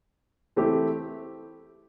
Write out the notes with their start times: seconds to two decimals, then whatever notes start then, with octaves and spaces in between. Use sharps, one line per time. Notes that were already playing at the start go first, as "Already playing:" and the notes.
0.56 E3 A3 C4 E4 G4